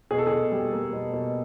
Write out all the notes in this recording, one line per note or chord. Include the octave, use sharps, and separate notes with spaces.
B2 G#4
A4
B2 G#4
G3
A#3
B2
B2